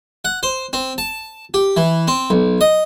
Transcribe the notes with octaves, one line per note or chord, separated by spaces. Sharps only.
F#5
C5
C4
A5
G4
E3
C4
B1
D#5